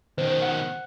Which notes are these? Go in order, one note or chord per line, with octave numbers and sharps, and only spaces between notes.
B2 D#3 C5
F#5